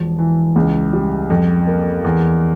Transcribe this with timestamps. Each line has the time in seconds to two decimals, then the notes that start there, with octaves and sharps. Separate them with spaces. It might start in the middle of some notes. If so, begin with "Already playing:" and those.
Already playing: E1 F3
0.19 E3
0.56 C#2
0.93 G3
1.30 F2
1.67 A#3
2.04 E2